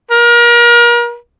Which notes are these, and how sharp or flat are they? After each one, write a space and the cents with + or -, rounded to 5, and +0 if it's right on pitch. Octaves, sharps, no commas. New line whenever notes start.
A#4 +35